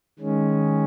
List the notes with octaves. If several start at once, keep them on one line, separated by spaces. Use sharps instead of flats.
D#3 G#3 C#4